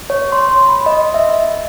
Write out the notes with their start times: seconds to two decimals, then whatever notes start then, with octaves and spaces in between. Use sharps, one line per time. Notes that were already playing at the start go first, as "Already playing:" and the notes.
0.10 C#5
0.32 C6
0.68 B5
0.86 D#5
1.14 E5